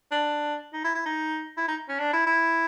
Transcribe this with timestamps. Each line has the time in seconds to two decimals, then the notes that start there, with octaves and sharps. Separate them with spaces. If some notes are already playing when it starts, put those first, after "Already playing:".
0.12 D4
0.73 D#4
0.84 E4
0.95 E4
1.06 D#4
1.57 E4
1.68 D#4
1.89 C#4
1.99 D4
2.13 E4
2.27 E4